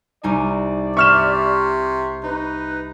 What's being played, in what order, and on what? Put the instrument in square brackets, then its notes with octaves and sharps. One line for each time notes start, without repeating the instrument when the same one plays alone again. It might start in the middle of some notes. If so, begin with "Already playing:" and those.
[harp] C2 D#4 G#5 [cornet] D5
[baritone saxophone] C3 [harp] E5 C6 [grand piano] C#6 F6 E7
[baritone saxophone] D#4 [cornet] B4